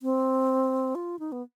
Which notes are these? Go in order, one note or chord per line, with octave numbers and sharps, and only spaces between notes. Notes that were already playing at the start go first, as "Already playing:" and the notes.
C4
F4
D#4
B3